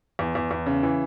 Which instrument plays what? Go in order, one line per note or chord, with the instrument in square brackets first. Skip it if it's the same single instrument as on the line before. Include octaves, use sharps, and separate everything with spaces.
[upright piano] E2
E2
E2
C#3
E3